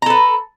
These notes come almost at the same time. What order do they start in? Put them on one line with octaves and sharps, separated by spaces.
A#5 A4 B4